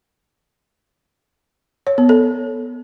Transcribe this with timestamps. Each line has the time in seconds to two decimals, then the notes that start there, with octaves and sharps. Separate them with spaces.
1.87 C#5
1.98 B3
2.09 A4